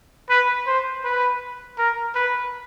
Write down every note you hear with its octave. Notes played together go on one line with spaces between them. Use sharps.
B4
C5
B4
A#4
B4